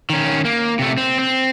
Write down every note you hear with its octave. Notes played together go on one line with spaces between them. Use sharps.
D#3 C#4
A#3
C3 A3
C4
C4